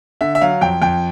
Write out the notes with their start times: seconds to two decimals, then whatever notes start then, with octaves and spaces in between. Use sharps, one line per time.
0.21 D3 E5
0.35 E5
0.41 F#3 F5
0.61 F2 G5
0.82 F2 G5